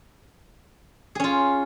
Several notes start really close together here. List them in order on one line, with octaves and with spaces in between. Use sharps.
G#4 C#4 F4